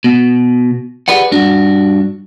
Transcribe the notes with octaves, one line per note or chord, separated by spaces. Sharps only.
B2
G4 G#4 B4 D5 F#5
G2 D4 F#4